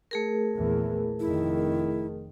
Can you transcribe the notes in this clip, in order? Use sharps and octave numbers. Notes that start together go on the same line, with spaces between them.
A3 G#4 A#4
A#1 E2 E3
F1 F2 D#3 E4